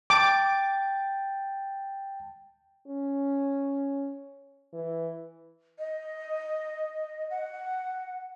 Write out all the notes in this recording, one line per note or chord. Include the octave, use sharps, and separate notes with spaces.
G5 A5 D6 A6
C#4
E3
D#5
F#5